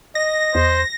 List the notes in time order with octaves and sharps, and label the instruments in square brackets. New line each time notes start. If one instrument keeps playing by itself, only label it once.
[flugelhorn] D#5 [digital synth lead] A#6
[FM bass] E2 [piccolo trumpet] C5